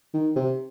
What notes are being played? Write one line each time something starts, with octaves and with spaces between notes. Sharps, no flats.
D#3
C3